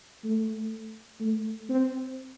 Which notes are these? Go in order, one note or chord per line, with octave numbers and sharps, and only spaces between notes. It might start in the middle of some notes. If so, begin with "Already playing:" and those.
A3
A3
C4